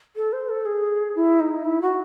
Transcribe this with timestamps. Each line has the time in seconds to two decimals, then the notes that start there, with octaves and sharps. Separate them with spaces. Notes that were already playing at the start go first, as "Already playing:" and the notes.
0.16 A4
0.33 C5
0.49 A4
0.65 G#4
1.16 E4
1.40 D#4
1.64 E4
1.82 F#4